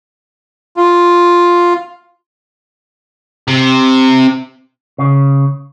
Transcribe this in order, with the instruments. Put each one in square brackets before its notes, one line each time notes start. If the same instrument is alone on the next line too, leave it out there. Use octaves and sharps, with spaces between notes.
[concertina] F4
[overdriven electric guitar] C3
[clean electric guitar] C#3